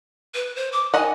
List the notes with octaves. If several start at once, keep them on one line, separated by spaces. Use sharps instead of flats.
B4
C5
D6
D#3 D#5 F#5 G#5